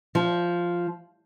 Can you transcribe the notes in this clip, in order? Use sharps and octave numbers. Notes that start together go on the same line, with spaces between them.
F3